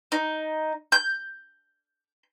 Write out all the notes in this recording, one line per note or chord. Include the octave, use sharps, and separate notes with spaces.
D#4
G6